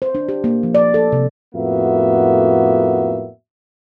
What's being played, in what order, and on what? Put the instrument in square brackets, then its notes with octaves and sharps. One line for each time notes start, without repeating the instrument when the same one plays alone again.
[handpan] C5
D4
G4
A#3
F3
D5
A4
C3
[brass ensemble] F2 A2 A#3 B3 F#4 E5